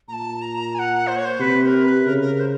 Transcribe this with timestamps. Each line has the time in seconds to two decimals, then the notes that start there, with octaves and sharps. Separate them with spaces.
0.08 A#2 A5 A#5
0.42 A#5
0.75 G#5
0.79 F#5
1.07 C5
1.16 C#5
1.25 C5
1.40 C3 B4
1.63 B4
1.66 A#4
1.84 B4
2.06 C#3 A#4
2.21 A#4
2.39 C5